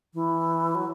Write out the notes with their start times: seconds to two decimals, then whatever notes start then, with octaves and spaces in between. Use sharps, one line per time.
0.14 E3
0.75 F#3